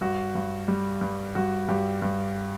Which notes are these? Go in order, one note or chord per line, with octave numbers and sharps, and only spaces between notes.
G2 F#4
G2
G3
G2
G2 F#4
G2 G4
G2